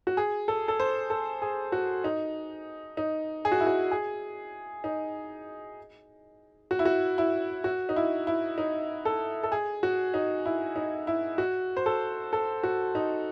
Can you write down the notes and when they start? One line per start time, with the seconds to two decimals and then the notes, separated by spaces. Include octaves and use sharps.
0.07 F#4
0.17 G#4
0.48 A4
0.68 A4
0.80 C5
1.10 A4
1.42 G#4
1.72 F#4
2.04 D#4
2.97 D#4
3.45 G#4
3.52 F#4
3.60 E4
3.66 F#4
3.91 G#4
4.84 D#4
6.71 F#4
6.79 E4
6.85 F#4
7.18 E4
7.64 F#4
7.89 D#4
7.96 E4
8.27 E4
8.58 D#4
9.05 A4
9.43 A4
9.52 G#4
9.83 F#4
10.14 D#4
10.46 E4
10.76 D#4
11.07 E4
11.38 F#4
11.77 C5
11.86 A4
12.33 A4
12.63 F#4
12.95 D#4